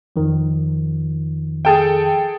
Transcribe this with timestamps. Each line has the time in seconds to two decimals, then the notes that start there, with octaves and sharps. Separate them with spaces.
0.16 F2 D#3 F3
1.65 G#4 A4 G5